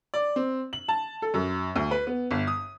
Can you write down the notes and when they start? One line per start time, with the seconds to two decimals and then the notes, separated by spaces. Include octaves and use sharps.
0.14 D5
0.36 C4
0.73 F#7
0.88 A5
1.22 A4
1.34 F#2
1.76 D2
1.91 B4
2.07 B3
2.31 G1
2.47 D#6